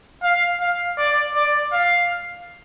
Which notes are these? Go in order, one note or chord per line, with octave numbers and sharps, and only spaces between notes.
F5
F5
D5
D5
F5